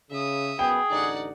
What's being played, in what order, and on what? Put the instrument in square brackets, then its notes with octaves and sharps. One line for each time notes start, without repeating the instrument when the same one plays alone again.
[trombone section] C#3 [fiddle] E5 D#6
[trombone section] F#2 B3 [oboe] G#4 [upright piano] G5
[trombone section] A1 D3 D#4 [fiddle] D5 F#5